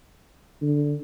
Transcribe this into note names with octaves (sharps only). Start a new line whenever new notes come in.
D3